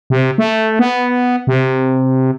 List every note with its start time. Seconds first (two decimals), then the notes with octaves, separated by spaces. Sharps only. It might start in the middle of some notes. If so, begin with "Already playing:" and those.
0.10 C3
0.38 A3
0.79 B3
1.47 C3